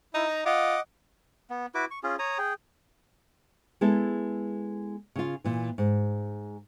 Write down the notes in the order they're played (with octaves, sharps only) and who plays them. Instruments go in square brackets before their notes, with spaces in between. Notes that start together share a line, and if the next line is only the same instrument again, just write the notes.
[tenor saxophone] D#4 [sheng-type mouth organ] E4
[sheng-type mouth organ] A#5
[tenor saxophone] F4 [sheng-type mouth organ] D#5 F#5 D6
[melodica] B3
E4 F#4 B4 D6
C#6
C#4 F4 G#4
C#5 A#5 D#6
G#4 G5
[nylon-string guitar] G#3 B3 E4 A4
C#3 F4
A#2 E3
G#2